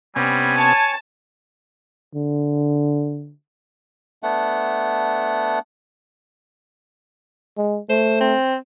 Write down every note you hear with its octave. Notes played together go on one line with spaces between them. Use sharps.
C3 G3 B3 C#4 G#5
C#5 A5
D3
A3 B3 D4 F#5
G#3
A3 C5
C4